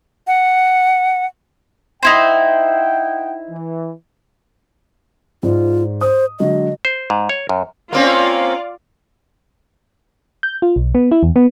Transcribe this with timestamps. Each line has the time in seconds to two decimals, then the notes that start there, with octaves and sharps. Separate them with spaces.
0.27 F#5
2.03 D#4 E4 C5 D#5 F#5 G5
3.51 E3
5.43 G#2 F4 C5 D5
6.01 C5 D#6
6.40 D3 F#3 G#3 D#5
6.85 C5
7.10 G#2
7.29 C#5
7.49 F#2
7.93 A#3 C4 C#4 F4 D5 F5
10.43 G6
10.62 F4
10.76 B1
10.95 B3
11.11 E4
11.23 E2
11.36 B3